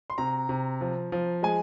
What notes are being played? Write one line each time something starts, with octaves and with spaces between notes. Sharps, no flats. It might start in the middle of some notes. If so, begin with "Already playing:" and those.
C6
C3 A#5
C3
F3
F3
G#3 G#5